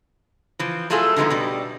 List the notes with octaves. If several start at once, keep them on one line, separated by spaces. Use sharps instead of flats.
E3 F3
F#3 A3 E4 F4 G#4 A4
D3 F3 G#3 B3 D#4
B2 G3